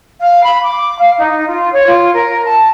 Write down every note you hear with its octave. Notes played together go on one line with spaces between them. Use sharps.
F5
B5
D6
F5
D#4
F4
C#5
F4
A#4
A5